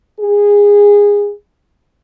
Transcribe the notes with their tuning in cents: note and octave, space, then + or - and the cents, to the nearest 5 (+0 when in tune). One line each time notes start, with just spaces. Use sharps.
G#4 -20